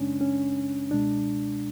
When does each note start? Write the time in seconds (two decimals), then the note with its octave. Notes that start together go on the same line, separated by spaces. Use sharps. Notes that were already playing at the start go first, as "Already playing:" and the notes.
Already playing: F#2 C#3 G#3 C#4 D4
0.21 C#4
0.91 C#2 B2 G#3 D4